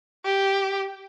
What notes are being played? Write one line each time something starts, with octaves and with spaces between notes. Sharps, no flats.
G4